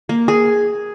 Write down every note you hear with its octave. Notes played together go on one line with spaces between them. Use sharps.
A#3
G#4